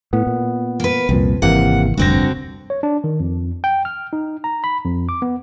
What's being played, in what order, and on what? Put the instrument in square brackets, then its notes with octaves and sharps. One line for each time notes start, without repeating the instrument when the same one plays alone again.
[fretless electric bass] A2 [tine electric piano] B3
[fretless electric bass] A#2
[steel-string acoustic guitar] A#3 B4
[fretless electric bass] C2 A#2 [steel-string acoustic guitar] F2
[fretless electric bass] G#1 E3 [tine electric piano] C3 A#3 [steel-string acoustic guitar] F#5
[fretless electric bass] F1 D2 [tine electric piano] G2 A#6 [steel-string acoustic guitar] D3 C4 F#4
[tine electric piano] C#5
D4
D#3
F2
G5
F6
D#4
A#5
B5
F2
D6
B3